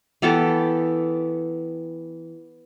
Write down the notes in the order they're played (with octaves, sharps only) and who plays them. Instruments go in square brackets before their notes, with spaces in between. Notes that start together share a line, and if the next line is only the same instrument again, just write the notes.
[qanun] E3 B3 G4 A4